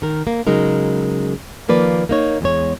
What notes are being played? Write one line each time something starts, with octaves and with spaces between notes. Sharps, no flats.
D#3 A#4
A#3
C#3 F#3 G#3 D#4 A#4
D#3 F3 A#3 B4 D5
A#3 D#4 C#5
E2 G#3 C#5